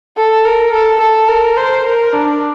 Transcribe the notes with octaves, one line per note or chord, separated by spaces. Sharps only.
A4
A#4
A4
A4
A#4
C5
A#4
D4